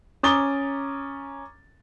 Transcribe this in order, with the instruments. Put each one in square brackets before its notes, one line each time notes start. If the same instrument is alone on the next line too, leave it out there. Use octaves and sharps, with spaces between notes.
[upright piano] C#4 A#5 D6 D#6 A6 G7